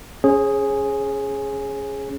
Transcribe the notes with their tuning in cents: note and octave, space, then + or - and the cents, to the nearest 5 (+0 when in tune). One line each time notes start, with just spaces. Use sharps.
C#4 +0 G#4 +0 C#5 -40